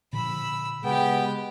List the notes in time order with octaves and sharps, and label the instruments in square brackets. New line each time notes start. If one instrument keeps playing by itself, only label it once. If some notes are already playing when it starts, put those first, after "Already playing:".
[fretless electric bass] A#2 D3 F3 [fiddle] B5 E6
[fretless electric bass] C#3 [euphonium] G#3 [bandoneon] B3 [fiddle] G4 G5